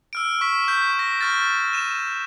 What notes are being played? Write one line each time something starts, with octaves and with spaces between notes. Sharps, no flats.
E6 F6 D7
C#6 B6
C#6 G6 B6
A#6
C#6 F6 A6
D#7 E7